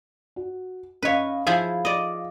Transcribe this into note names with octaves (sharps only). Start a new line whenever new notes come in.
F#4
C#4 B4 C#5 D#5 F5
F3 E4 G#4 F5
D5 D#5